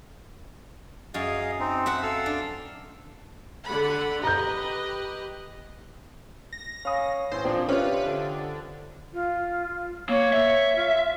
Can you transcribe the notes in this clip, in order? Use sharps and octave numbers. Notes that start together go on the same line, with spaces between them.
F#2 G#4 D#5 F5
C4 D#4
C4 E5 F#5
A4 F5 E6
D4
D3 F#5 B5
G4 B4 D#5 A#5 G6
A#6
C#4 F5 B5 D#6
A1 C5 C6
A#2 F3 C4 D4 G5
C3 C#4 F4 B4
D3
F4
A#3 C#5
E5
F4